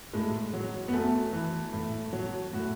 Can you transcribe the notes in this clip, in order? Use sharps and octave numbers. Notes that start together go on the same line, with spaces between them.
A2 G#3
F#3
B3
F#2 A3
E3
A2
F#3
A2 F#4